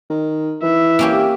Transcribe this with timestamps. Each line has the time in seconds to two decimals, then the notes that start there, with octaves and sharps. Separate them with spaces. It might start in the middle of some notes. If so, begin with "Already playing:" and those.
0.10 D#3
0.63 E3 E5
0.99 A#3 C#4 G4